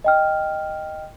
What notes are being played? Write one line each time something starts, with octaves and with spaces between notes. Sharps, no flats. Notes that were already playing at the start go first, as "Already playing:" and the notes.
D#5 G5 F6